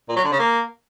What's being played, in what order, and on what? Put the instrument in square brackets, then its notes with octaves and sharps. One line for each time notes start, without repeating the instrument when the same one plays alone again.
[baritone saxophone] A#2
F#3
D3
C#3
A#3